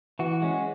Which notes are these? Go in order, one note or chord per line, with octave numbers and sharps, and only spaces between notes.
E3 F#4
G#3 C#4